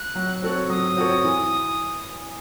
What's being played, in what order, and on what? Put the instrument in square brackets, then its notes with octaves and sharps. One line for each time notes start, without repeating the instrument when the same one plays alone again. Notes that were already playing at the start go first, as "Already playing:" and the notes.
Already playing: [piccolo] F#6
[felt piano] F#3
C4 F#4 A4 C#5
[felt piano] F#3 [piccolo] D#6
[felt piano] C4 F#4 A4 C#5
E3